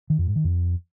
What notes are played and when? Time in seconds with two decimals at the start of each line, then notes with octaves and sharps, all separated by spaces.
0.10 D#3
0.18 F2
0.27 G#2
0.36 D#3
0.44 F2